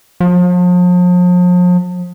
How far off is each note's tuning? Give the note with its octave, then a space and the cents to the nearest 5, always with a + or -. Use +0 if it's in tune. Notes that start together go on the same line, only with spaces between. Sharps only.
F3 +40